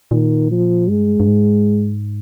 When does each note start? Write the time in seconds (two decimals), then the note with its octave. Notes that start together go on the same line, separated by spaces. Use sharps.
0.11 A#2 D#3
0.51 F3
0.89 G2 G#3
1.20 G2
1.28 G#2